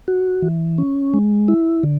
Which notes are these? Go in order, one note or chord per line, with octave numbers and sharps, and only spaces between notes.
F#4
E3
C#4
G#3
E4
D3